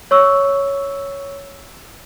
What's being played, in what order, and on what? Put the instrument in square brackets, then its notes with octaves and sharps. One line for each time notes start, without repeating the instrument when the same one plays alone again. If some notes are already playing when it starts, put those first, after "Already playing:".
[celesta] C#5 C#6 E6